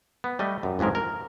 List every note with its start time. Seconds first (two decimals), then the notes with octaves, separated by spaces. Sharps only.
0.24 B3
0.39 G3 A3 D#5
0.63 F#2
0.79 A1 F2 G#2 G#3 A#4
0.95 A#4